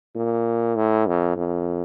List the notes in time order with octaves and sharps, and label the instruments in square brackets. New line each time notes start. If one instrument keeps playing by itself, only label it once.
[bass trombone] A#2
A2
F2
F2